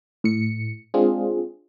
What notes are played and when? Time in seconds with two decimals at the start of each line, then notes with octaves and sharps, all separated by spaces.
0.24 A2 C#7
0.94 G#3 C4 D4 F4 G#4